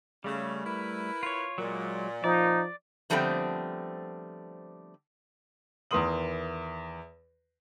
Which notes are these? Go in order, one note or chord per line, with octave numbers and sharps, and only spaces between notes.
C#3 G3 A3
E4 A#4 B4
F4 C#5
A#2 F#3 G#3
F3 D#4 D5
D3 F3 G3 A3 B3 C4
E2 D#3 A#4 C6 D#6 F#7